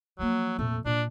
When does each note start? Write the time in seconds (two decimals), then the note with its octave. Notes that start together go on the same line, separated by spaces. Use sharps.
0.19 F3 F#3 A#3
0.59 F2 A#2 A3
0.85 A#2 D4